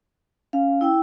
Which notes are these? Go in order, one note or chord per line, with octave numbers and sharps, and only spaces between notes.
C#4 F5
E4 G5 E6